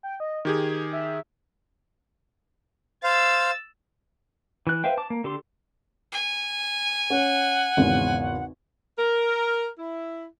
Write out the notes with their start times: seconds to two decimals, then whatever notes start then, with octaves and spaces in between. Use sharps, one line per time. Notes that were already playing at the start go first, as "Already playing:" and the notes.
0.03 G5
0.20 D#5
0.45 D#3 G4 G#4 G#6
0.93 E5
3.04 C5 F5 E6 A6
4.67 E3 F#6
4.84 B4 C5 E5 F5 G5
4.98 A5 D6
5.10 A#3
5.24 D3 G4 A4 C6
6.12 G#5
7.10 C#4 F#5
7.77 G#1 E2 C#3
8.99 A#4
9.78 E4